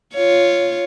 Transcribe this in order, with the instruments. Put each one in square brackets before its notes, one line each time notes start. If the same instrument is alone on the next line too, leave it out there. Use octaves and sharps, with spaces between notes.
[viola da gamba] F4 C#5